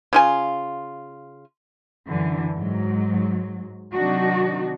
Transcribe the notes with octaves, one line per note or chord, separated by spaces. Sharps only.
C#3 F4 G#5
F#2 D3 E3
G#2 F#3
C3 D#3 F#3 D4 D#4 F#4